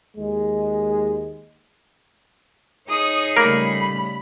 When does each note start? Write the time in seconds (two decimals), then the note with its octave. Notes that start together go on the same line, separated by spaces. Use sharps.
0.16 D#2 G#3
2.89 D#4 G#4 C#5 D#6
3.37 C#3 G3 A3 A#3 A#4 B5